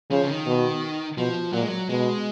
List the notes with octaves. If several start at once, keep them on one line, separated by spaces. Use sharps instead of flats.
C#3 F3
C#3
D#3
B2
B2 F3
A#2 F#3
G#3
F#3
B2 G#3